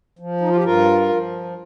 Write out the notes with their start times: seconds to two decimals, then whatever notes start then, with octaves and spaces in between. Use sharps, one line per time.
0.19 F3
0.41 D#4
0.49 F4
0.56 G4
0.64 G2 F4 A#4
1.09 F3